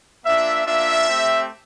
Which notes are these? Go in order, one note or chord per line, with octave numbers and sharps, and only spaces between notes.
A#3 D4 F4 E5
A#3 D4 F4 E5
A3 C4 G4